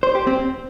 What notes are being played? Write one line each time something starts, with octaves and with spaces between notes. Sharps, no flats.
C5
G4
C4